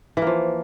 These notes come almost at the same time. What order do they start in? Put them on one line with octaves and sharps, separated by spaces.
E3 A#3 F3